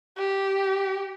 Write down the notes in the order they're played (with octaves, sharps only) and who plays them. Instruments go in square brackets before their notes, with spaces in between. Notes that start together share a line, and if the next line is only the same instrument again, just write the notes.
[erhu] G4